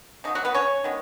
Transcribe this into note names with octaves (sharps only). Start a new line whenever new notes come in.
C#3 F#3 B3 D#4
F#3 F#4
B3 B4
C#4 C#5
D#3 G#3 B3